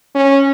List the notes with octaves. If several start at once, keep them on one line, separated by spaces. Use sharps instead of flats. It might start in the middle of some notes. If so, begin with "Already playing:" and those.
C#4